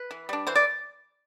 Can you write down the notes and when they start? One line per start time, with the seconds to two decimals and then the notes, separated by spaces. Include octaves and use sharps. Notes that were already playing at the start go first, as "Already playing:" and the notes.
Already playing: B4
0.11 E3
0.29 G3 D4
0.47 E3 C5
0.56 D5